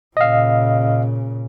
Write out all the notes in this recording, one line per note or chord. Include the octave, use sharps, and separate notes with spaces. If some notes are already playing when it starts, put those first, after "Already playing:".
A#2 C#3 D#5 F5